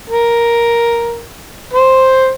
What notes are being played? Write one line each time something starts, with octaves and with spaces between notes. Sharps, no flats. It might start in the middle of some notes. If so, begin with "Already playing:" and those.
A#4
C5